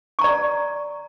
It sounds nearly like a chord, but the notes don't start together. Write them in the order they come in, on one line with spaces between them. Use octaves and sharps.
C#6 A#5 D5